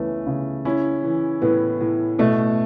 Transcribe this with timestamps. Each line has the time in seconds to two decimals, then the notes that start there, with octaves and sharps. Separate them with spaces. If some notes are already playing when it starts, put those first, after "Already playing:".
Already playing: C#2 E3 A3 B3 C#4
0.27 C#3
0.65 C#4 E4
1.04 E3
1.42 A2 B3
1.81 A2
2.19 B2 A3